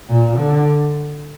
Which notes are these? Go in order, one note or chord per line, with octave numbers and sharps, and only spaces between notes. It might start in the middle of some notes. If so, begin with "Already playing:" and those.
A#2
D3